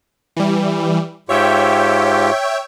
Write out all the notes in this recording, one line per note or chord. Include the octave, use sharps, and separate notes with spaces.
E3 G3
G#2 F4 G4 C#5 E5 G5